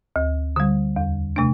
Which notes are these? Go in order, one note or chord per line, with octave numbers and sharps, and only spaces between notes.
D2
D3 G3
E2
C3 A3 D4